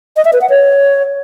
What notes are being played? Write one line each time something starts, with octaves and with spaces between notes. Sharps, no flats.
D#5
E5
B4
F#5
C#5